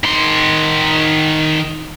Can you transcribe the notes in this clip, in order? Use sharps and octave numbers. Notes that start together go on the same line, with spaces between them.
D#3 C6